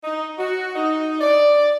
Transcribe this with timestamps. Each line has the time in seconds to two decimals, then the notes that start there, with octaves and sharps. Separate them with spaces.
0.04 D#4
0.38 F#4
0.75 D#4
1.21 D5